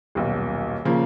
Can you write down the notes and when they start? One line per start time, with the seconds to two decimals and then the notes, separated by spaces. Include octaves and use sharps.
0.15 D#1 B1
0.85 A#2 C#3 F3 A#3